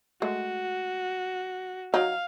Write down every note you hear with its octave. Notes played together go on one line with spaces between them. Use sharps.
G#3 A3 F#4
F#3 D#4 F5